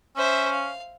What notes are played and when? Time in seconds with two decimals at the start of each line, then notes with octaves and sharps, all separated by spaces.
0.16 C#4 C5 E5
0.52 F5